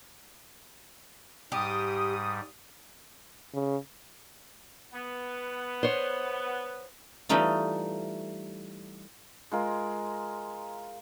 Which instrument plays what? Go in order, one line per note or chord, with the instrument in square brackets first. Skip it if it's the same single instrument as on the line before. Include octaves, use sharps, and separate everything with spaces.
[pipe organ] G#2 G3 [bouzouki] G4 [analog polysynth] D#6
[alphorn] C#3
[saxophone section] B3
[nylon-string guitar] C5 C#5
[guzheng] E3 G3 A3 D#4 F4
[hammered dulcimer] G#3 F4 A#4